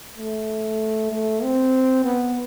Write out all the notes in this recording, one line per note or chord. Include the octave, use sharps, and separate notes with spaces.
A3
A3
C4
B3